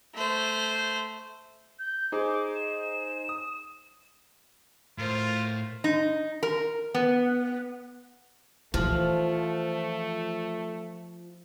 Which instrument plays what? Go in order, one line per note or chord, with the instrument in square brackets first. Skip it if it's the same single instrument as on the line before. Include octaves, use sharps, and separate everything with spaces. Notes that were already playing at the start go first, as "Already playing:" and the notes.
[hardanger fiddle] A3 C5
[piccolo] G6
[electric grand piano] D#4 G#4 C5 [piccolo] D6
[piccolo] E7
[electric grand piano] D#6
[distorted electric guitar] A2 [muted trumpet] F4 [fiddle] A#4 C5
[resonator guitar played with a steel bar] D#4
A#4
B3
[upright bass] E3 D#4 [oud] F3 [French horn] A3